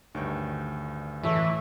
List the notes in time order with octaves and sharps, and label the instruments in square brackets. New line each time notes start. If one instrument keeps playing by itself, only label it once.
[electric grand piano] D2 G2 [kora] D#3 C#5 G5
[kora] A2 A3 [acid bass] E3 [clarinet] E5